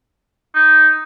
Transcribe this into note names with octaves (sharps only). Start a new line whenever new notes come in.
D#4